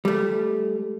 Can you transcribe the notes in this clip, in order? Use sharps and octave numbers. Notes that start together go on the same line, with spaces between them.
G3 A3